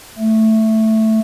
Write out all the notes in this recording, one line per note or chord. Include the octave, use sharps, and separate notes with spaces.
A3